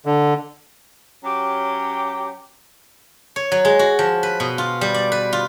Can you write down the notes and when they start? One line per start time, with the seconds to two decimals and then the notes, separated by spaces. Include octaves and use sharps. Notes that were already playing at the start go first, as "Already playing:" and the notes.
0.06 D3
1.24 F#3 C#4 G4
3.36 C#5
3.52 F#3
3.65 G#3
3.79 F#4
3.99 F3
4.23 B4
4.40 B2
4.58 F4
4.81 G3
4.94 D5
5.12 B4
5.33 F4